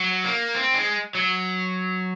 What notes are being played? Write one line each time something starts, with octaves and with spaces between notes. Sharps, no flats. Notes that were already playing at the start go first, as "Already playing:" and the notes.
Already playing: F#3
A#3
C4
G#3
F#3